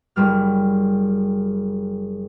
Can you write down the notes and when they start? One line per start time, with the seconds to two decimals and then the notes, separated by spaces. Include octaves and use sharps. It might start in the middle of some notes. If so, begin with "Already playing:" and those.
0.16 F#1 G3 F6